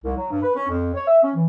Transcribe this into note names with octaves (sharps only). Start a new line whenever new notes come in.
C2
F#3
G2
B4
C#4
F2
C#5
E5
C#4
E3